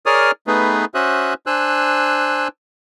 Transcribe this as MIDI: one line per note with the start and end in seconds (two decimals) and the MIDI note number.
0.06 0.31 68
0.06 0.31 70
0.06 0.31 73
0.06 0.31 74
0.06 0.31 87
0.06 0.31 89
0.47 0.85 57
0.47 0.85 59
0.47 0.85 63
0.47 0.85 68
0.47 0.85 71
0.95 1.34 61
0.95 1.34 66
0.95 1.34 72
0.95 1.34 76
0.95 1.34 87
0.95 1.34 90
1.47 2.48 62
1.47 2.48 72
1.47 2.48 80
1.47 2.48 88
1.47 2.48 90